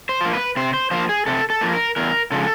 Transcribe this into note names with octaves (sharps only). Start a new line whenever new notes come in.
C5
F3 A#3
B4
C3 C5
C5
F3 A#3 C5
G#4
C3 A4
A4
F3 A#3
A#4
E2 A#4
C#3 F3 G#3 A4